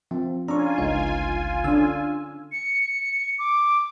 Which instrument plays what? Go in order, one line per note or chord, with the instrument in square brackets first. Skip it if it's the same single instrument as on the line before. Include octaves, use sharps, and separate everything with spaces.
[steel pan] F3 [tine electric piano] C4
[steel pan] C#4 D4 [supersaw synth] F4 G#5 [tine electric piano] A#5 C#6
[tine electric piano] G1 C#2 F5 [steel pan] D#4
[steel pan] D3 C#4 D4 [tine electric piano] E6
[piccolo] C#7
D6